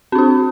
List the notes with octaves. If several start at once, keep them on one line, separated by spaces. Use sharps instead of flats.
C4 D4 F#4